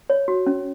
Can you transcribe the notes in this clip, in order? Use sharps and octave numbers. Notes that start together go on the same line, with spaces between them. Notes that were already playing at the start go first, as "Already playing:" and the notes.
C#5
F#4
C#4